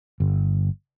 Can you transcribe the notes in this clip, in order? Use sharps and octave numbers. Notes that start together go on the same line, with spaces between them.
G1